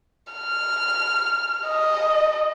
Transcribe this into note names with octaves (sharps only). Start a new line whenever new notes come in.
F6
D#5